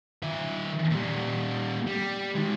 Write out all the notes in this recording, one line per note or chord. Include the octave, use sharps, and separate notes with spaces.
D#3 E5
A#2 G3
G3
D#3 G#3